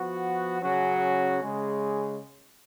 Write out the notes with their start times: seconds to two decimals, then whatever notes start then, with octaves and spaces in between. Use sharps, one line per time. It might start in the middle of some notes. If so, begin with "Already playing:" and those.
Already playing: F3 B3 F#4
0.62 C#3 F#3 C#4 F#4
1.40 C#3 G#3